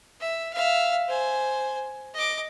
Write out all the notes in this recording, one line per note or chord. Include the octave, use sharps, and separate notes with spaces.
E5
E5 F5
C5 G#5
D#5 D6